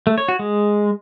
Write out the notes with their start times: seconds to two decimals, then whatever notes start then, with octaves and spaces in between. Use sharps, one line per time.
0.07 A3
0.18 C#5
0.28 F#4
0.39 G#3